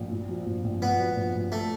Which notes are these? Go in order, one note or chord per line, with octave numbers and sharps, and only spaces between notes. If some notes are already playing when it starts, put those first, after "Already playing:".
Already playing: A#1
A#2
F3
A#1
A#1
A#2 B3
F3
A#1
A#1
A3